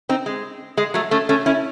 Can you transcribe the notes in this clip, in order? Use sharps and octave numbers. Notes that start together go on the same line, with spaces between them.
C4 D#4
G#3
G#3
F#3 A3
A3 C#4
A3 C#4
C#4 E4